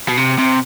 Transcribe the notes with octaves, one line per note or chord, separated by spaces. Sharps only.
B2
C3
C3